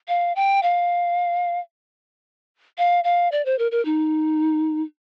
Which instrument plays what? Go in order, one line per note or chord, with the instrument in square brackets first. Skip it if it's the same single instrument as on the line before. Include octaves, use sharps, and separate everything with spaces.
[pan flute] F5
G5
F5
F5
F5
D5
C5
A#4
A#4
D#4